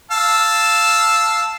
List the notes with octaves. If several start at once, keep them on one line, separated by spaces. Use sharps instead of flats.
F5 A5 E6